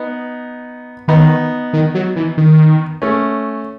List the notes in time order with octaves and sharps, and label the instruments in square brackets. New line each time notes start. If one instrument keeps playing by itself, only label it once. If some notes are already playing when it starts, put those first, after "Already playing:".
Already playing: [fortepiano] B3 D#4
[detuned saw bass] D#3 [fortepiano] B3 D#4
[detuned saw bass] D#3
F#3
E3
D#3
[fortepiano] A3 C#4